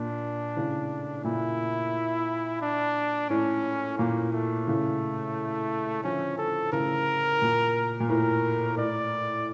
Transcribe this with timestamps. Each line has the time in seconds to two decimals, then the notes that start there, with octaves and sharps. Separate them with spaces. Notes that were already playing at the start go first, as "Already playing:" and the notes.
Already playing: A#2 D4
0.56 A2 C#3
1.24 A#2 E4
2.61 D4
3.30 A2 C#4
3.98 A#2 A#3
4.33 A3
4.67 A2 C#3
6.04 D3 F3 C#4
6.38 A4
6.72 A2 C#3 A#4
7.42 A#2
8.00 A#2
8.09 A2 A#4
8.77 A2 D5